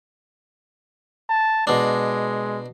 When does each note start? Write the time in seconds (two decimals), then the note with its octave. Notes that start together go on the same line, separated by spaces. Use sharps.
1.29 A5
1.67 B2 G#3 D4